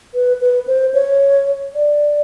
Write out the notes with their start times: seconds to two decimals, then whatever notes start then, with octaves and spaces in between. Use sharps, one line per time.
0.14 B4
0.41 B4
0.67 C5
0.94 C#5
1.75 D5